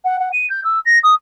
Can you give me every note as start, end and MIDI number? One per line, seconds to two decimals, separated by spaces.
0.05 0.19 78
0.19 0.29 78
0.33 0.47 99
0.50 0.63 91
0.64 0.79 88
0.86 0.99 94
1.03 1.14 87